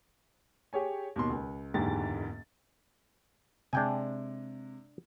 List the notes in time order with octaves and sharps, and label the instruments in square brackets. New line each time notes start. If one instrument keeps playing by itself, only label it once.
[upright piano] G4 G#4 C#5 G#5
D#2 B2 C6
C#2
F#1 E2 G#2 D3 G4 A6
[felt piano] C3 G#3 [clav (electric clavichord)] D4 G5 G#5